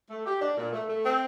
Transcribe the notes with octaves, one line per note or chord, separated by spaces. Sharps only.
A3
G4
D4
A#2
A3
A3
C4